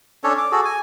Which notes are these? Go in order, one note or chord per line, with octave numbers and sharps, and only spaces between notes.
C#4 D4 A4 C#5
D6
F#4 G#4 A4
G#5